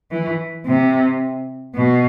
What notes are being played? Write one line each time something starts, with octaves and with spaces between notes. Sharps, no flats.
E3
C3
B2